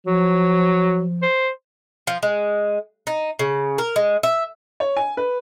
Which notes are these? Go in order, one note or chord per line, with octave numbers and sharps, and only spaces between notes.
F3 F#3
C5
F3
G#3
D#4
C#3
A#4
G#3
E5
C#5
G#5
B4